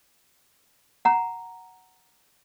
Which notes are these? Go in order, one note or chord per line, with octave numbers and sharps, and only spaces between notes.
F#5 A#5